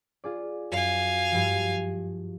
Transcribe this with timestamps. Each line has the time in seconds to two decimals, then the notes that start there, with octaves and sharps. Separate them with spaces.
0.24 F4 G#4 D5
0.72 F#2 F5 G#5
1.32 G2 F3